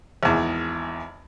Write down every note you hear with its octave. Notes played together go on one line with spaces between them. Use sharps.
G#1 E2